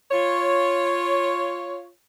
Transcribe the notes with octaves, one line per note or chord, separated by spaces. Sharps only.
F4 C#5